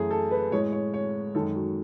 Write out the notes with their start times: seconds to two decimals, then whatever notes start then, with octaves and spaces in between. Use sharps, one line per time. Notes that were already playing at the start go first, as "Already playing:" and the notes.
Already playing: F#2 E3 A3 G#4
0.11 A4
0.31 B4
0.52 A2 G#3 C#5
0.72 C#5
0.94 C#5
1.35 F#2 D#3 G#3 A4
1.55 F#4